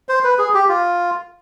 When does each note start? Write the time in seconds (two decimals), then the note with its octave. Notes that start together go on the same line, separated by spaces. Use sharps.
0.09 C5
0.24 B4
0.38 G#4
0.54 G4
0.69 F4